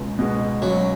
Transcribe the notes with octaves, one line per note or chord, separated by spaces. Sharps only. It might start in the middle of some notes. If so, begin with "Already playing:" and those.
Already playing: C#2 B2 G#3 B3
B2 G#3 B3
C#2 F#3